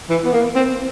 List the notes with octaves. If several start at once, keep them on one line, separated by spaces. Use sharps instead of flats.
E3
B3
A#3
C4